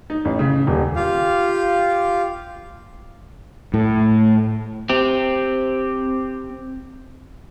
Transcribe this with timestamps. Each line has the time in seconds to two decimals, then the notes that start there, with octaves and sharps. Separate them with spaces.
0.10 D#4
0.25 A1
0.39 C#3
0.67 D#1
0.96 F4 G4 F5
3.74 A2
4.89 C4 G4